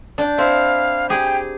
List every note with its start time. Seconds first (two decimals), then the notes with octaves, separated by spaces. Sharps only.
0.18 D4 G5
0.38 C4 E4 F5
1.10 G4 G#4 G5